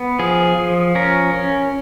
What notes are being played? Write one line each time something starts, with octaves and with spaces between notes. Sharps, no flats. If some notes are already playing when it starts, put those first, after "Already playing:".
Already playing: B3
F3 G#4
F3
C#4 A#4
C#4